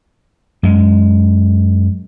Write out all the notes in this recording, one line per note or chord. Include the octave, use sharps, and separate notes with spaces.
F#2 G#3